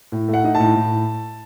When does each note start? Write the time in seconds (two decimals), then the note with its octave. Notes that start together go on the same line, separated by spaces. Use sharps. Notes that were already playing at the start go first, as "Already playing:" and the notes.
0.12 A2
0.28 A3
0.34 F#5
0.44 D#4
0.55 A5
0.60 A2
0.75 A2